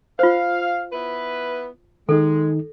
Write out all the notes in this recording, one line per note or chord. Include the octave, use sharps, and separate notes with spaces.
F4 C5 F5
B3 E4 B4
D#3 G#3 D#4 A4